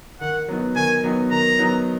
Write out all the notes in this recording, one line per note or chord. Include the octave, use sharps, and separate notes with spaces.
D#3 F#5
F#3 B3 D#4
D#3 G#5
F#3 B3 D#4
D#3 A#5
F#3 B3 D#4